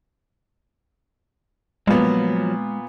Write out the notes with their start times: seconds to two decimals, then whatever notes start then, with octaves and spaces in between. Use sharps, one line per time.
1.87 A#2 F3 F#3 G#3 B3